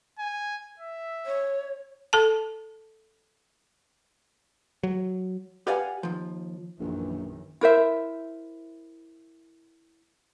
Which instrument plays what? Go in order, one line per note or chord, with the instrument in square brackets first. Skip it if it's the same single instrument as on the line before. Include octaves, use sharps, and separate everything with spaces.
[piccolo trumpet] G#5
E5
[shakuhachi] C#5
[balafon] A4 A5
[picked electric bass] F#3
[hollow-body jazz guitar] G4 B4 D5 F5 F#5 G#5
D#2 F3
[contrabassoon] A#1 [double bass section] F#2 D#3 E3
[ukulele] E4 A#4 C5 E5